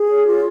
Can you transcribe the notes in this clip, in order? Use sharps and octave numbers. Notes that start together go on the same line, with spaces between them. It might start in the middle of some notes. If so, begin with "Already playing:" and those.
Already playing: G#4
C#5
F4